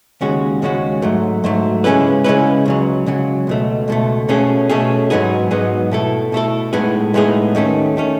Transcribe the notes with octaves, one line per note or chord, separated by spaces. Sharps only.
D#2 C#3 G#3 C#4 F#4
D#2 C#3 G#3 C#4 F#4
G#2 F#3 A3
G#2 F#3 A3
C#3 G#3 C#4 E4 B4
C#3 G#3 C#4 E4 B4
C#2 C#3 F#3
C#2 C#3 F#3
C#2 B2 A3
C#2 B2 A3
B2 A3 C#4 G#4
B2 A3 C#4 G#4
G#2 F#3 B3 D#4 G#4
G#2 F#3 B3 D#4 G#4
B2 A3 E4 A4
B2 A3 E4 A4
A2 G#3 B3 D#4 G#4
A2 G#3 B3 D#4 G#4
D#2 D#3 A3 C#4
D#3 A3 C#4